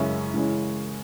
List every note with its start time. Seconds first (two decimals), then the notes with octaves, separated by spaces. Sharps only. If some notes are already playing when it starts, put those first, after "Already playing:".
Already playing: F#2 C#3 G#3 C#4 E4
0.34 C#3 E3 G#3 C#4